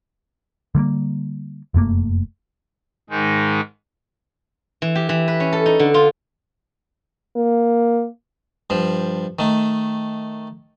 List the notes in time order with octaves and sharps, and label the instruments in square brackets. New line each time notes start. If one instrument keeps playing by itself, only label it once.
[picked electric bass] D3 G3 A3 A#3
F1 F#2 A3 A#3
[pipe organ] G#2 D#3 G#3 D#4
[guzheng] E3
G4
E3
B4
C#4
A4
D#4
D3
F4
[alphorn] A#3
[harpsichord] G2 F3
D#3 A3